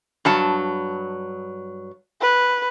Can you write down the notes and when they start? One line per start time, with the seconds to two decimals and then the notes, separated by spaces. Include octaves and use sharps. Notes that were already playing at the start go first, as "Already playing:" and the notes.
0.25 G2 F#3 A5
2.21 B4